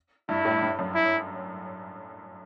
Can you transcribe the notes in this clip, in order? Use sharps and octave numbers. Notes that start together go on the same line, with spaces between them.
G2 E4
A2
G2
F#2
E4